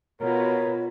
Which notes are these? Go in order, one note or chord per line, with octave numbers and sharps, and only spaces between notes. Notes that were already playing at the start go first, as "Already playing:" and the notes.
B2 F4 F#4 A#4 B4 C#5